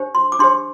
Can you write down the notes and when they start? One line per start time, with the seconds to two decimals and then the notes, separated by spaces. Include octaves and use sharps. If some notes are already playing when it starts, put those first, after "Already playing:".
Already playing: D4 G4 C5
0.15 C6
0.32 D6
0.39 D4 G4 C5 C6